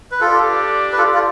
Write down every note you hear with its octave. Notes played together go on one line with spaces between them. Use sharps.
B4
D4 F4 G4 A4 D5
B4
F4 A4
F4